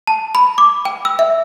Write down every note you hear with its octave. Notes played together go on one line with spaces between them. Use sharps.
A5
B5
D6
G5
E6
E5